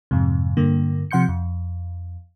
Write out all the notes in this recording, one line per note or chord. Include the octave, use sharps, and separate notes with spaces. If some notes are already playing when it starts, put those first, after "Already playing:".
F2 G#2 C3
G2 D3 A#3
C3 F3 F#5 C6 G6 C#7
F2